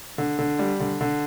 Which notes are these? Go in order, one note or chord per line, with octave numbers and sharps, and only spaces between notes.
D3
D3
G3
D3
D3